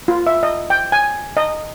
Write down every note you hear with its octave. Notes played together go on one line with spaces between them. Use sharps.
F4
E5
D#5
G5
G#5
D#5